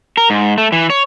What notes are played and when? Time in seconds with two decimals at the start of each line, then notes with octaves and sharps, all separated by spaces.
0.17 A#4
0.30 G#2
0.58 A3
0.72 E3
0.90 C#5